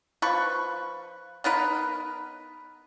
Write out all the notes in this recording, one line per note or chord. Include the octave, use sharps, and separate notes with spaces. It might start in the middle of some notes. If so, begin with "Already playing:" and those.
F3 B4 C#6
B3 D#4 A#4 B4